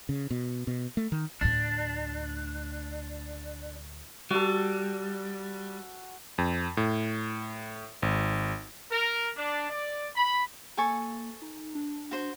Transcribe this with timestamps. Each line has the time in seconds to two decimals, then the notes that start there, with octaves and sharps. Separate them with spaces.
0.09 C#3
0.31 B2
0.67 B2
0.97 A3
1.12 D#3
1.41 D2 A2 D4
4.31 G3 F#4 A4
6.38 F2
6.77 A2
8.02 G#1
8.90 A#4
9.36 D4
9.70 D5
10.16 B5
10.77 A#3 A4 G#5 C#6
11.42 D#4
11.75 D4
12.11 F#4 C5